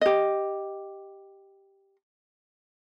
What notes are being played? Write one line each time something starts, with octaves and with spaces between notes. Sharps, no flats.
G4 D#5